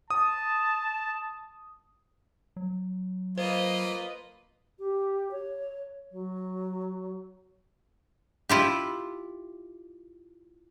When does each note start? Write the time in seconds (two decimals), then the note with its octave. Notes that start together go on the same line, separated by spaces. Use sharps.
0.10 A5 D#6
2.56 F#3
3.38 A#3 F4 B4 C5 D#5
4.79 G4
5.31 C#5
6.11 F#3
8.49 E4 F4 G4